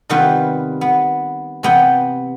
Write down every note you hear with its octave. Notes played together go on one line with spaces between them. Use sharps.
C3 D#3 G3 B3 F4 B4
B3
C3 E3 B3 F#5 G5